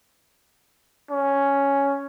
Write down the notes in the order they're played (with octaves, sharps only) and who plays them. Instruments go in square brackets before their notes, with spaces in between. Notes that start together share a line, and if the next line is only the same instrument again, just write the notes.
[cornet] C#4